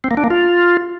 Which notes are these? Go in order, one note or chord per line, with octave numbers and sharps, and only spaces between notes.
C4
A#3
D4
A#3
F4